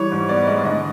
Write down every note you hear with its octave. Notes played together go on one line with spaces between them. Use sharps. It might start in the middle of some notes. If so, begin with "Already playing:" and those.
Already playing: E3 G3 C#5
G#2
B3 D5
G#3 D#5
D3 D#5